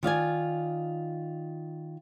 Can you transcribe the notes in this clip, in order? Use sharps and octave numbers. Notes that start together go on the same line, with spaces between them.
D#3 F4 D5 G#5